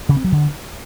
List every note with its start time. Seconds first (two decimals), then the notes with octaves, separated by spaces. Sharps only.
0.09 C#3
0.17 C4
0.25 F#3
0.32 D3